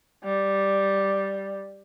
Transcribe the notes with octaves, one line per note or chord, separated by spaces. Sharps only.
G3